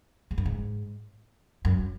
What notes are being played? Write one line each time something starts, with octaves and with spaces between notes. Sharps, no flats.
G#2
F#2
G#2
F#2